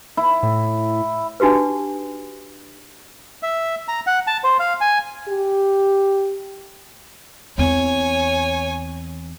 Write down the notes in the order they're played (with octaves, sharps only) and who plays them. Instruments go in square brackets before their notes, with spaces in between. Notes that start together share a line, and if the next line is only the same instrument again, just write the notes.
[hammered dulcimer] E4
[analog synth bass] A2
[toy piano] D4 D#4 F#4 G4 B4
[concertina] E5
A#5
F#5
A5
C5
F5
G#5
[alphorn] G4
[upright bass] E2 C4 [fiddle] C#5 G#5